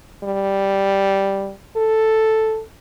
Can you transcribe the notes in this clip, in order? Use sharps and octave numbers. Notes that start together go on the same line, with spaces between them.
G3
A4